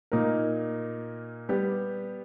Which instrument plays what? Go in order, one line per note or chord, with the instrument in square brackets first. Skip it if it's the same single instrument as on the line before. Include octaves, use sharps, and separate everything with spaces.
[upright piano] A#2 A#3 D#4 A#4
G3 B3 G4